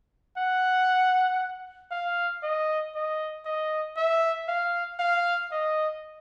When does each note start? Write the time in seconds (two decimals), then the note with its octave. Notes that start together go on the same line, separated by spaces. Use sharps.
0.37 F#5
1.91 F5
2.43 D#5
2.95 D#5
3.45 D#5
3.96 E5
4.48 F5
4.99 F5
5.51 D#5